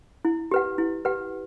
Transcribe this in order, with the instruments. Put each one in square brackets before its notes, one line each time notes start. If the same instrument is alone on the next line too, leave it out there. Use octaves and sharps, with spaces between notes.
[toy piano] E4
G4 B4 F#5
E4
G4 B4 F#5